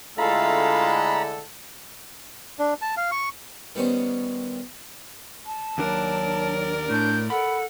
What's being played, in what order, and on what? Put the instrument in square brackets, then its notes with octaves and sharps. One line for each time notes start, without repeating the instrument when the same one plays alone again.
[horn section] D3 A4 [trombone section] G#3 A3 E4 [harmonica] F4 [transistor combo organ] A#5 B5
[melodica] D4
A5
F5
C#6
[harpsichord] D#3 G3 B3 C#4 C5
[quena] A5
[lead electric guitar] D#2 D4 [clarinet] F#3 [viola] A#4 D5
[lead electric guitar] A2 [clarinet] D4 [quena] G6
[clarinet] A4 [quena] F#5 [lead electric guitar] B5